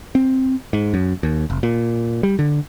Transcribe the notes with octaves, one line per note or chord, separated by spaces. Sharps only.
C4
G#2
F#2
D#2
F1
A#2
G3
D3